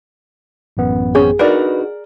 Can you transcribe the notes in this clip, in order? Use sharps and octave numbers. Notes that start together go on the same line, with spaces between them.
A1 F#2 B3
C4 C#4 G#4
D4 D#4 F#4 A#4 B4 D5